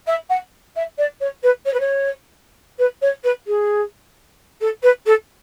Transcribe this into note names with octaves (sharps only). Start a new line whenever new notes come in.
E5
F#5
E5
D5
C#5
B4
C#5
B4
C#5
B4
C#5
B4
G#4
A4
B4
A4